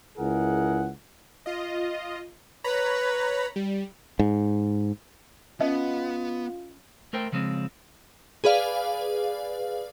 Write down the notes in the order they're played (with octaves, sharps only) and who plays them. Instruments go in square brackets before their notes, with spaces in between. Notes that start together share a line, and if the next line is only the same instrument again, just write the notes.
[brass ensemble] C#2 E4 G#4 A#4 F#5
[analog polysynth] F4 D#5
[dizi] B4 [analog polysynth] C#5 A#5 B5
[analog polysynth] G3
[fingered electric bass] G#2
[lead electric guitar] B3 [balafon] C#4 [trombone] F4 [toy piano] D#5
[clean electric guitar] A3 A#4 C5 G5
C#3 F3 G#3 C4
[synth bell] G#4 B4 D5 F5